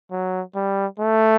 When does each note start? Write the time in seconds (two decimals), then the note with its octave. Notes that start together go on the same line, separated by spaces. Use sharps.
0.11 F#3
0.55 G3
0.99 A3